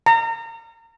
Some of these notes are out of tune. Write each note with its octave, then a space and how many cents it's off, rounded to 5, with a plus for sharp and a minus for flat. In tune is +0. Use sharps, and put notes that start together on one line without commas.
A#5 -30